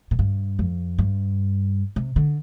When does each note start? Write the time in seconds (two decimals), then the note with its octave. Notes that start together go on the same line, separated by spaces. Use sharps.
0.11 A#2
0.19 G2
0.59 F2
0.98 G2
1.96 C3
2.16 D3